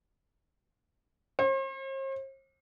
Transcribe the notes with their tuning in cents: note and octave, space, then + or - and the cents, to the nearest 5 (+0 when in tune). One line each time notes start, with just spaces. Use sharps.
C5 +45